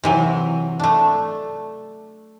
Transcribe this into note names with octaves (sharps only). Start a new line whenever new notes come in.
C3 E3 F#3
A3 D4